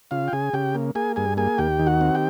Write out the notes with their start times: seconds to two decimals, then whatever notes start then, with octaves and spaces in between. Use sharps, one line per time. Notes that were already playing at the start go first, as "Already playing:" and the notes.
0.11 C#3 F4 F5
0.28 G5
0.33 C#3 G#4 G#5
0.53 C#3 G4 G5
0.75 A#3
0.95 A#3 G#4 G#5
1.16 G2 G#4 G#5
1.37 A#3 G#4 G#5
1.58 D#2 G4 G5
1.79 D#3
1.87 F#4 F#5
2.01 C4
2.15 G4 G5